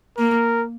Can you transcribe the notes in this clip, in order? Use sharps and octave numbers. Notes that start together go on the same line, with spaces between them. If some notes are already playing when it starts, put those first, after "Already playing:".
A#3 A#4